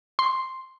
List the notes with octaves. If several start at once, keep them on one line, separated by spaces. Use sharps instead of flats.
C6